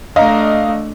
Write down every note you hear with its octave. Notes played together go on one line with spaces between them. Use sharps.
A3 D4 D#5 F5 A#5